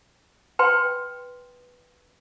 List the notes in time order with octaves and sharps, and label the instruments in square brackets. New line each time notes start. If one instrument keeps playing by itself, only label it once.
[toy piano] B4 G5 C6